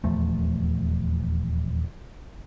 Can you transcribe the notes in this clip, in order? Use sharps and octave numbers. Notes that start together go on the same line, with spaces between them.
D#1 E2 F3 A3